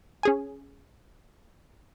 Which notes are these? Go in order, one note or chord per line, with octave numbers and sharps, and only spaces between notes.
C#4 G#4 G#5